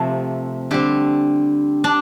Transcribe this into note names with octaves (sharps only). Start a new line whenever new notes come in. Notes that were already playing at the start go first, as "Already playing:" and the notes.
Already playing: C3 F3 A3
D3 G3 C4 G4
D4